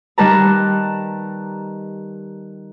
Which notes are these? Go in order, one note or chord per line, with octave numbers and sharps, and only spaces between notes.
D#3 G3 B4 A5 A#5